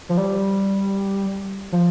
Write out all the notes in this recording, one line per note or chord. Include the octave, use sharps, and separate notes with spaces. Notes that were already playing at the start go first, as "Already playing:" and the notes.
F3
G3
F3